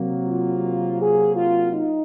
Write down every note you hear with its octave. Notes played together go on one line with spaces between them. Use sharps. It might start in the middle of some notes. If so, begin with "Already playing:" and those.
Already playing: C3 F#3 A#3
F4
G#4
F4
D#4